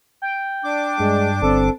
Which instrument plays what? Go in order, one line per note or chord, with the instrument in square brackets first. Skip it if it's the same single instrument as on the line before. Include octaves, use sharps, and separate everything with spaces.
[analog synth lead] G5
[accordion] D4 D6
[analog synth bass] G2 [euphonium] G#3
[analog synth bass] G1 [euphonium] C4 [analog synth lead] A4